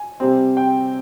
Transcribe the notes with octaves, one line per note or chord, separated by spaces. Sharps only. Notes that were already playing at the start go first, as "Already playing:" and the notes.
Already playing: G#5
C3 G3 C4
G5